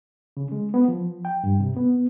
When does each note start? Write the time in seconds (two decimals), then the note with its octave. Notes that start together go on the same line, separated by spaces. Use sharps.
0.37 C#3
0.52 G#3
0.74 B3
0.88 F3
1.25 G5
1.44 G2
1.60 C3
1.77 B3